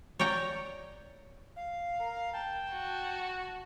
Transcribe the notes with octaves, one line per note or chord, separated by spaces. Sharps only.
C#5 D5 G5 A#5
F5
A#4
G5 A5
F#4